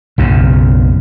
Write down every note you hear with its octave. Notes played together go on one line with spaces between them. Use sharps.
B1 F#2 C#3